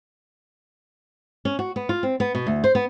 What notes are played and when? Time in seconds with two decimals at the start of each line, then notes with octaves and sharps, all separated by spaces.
1.45 C#4
1.59 F#4
1.76 B3
1.89 F4
2.03 C4
2.20 B3
2.35 B2
2.47 D2
2.64 C5
2.75 B3